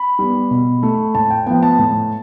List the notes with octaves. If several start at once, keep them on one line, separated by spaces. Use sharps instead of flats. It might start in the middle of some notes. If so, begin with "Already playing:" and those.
Already playing: B5
G3 B3
B2
A3
A2 A5
G5
F3 B3 G5
A5
A2